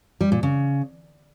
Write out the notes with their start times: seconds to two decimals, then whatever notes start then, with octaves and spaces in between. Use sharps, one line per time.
0.21 G3
0.32 A#2
0.43 C#3